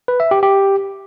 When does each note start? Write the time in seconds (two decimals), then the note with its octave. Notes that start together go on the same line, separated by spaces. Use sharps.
0.08 B4
0.20 E5
0.31 G4
0.43 G4